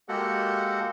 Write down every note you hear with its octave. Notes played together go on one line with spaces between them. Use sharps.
G#3 A#3 F#4 G4 A4 F#5